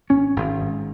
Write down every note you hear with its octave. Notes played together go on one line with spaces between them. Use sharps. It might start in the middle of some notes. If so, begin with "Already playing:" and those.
G#1 C#4
G#1
G#2